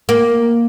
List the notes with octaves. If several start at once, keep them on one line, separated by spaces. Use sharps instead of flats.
A#3